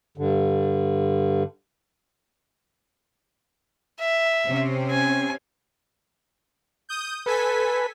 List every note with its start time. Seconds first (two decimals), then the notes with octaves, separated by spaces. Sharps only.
0.18 G2 D3
4.00 E5
4.45 C3 C4 C#4
4.92 G#5
6.89 D#6 G6
7.26 A4 B4 G#5 B6